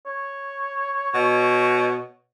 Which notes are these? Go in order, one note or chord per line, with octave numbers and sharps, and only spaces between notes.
C#5
B2